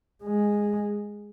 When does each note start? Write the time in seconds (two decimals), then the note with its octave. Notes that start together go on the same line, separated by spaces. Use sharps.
0.24 G#3